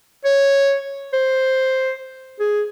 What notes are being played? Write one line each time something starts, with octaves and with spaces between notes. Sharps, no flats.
C#5
C5
G#4